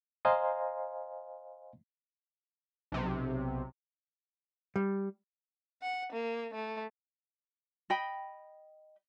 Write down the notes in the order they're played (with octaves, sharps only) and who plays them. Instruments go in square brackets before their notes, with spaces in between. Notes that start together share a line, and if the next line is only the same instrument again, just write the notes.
[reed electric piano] C5 D#5 F5 G#5 A#5 C6
[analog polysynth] B1 C3
[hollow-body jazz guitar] G3
[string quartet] F#5
A#3
A3
[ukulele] D#5 G5 B5